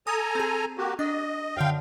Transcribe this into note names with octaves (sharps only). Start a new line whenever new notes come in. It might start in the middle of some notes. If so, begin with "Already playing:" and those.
A4 G#5 A#5 D#6
C4 G#4
A#3 F#4 G4
D4 D#5
F#2 D3 F5 G5